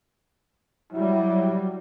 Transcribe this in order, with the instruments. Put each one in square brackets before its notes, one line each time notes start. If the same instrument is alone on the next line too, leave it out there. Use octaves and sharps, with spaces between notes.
[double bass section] F#3 G3 [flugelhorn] E4